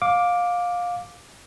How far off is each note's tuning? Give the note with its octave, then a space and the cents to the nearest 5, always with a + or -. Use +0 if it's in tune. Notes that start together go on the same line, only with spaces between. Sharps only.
F5 +20 D6 +0